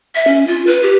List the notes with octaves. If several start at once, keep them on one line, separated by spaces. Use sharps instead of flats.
E5
C#4
F4
B4
G4